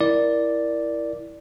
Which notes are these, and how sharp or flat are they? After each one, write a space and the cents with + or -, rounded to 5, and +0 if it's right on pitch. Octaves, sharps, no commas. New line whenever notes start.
E4 +0 A#4 +10 D5 +0